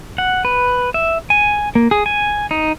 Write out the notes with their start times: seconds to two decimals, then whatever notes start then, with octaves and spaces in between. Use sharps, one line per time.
0.18 F#5
0.45 B4
0.94 E5
1.30 G#5
1.75 A#3
1.91 G#4
2.06 G#5
2.51 D#4